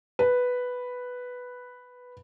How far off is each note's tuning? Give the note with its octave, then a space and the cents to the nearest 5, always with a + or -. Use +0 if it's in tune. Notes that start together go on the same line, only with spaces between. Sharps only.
B4 +0